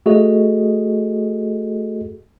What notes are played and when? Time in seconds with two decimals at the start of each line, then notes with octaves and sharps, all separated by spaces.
0.06 A3 F#4 G#4 A4 D#5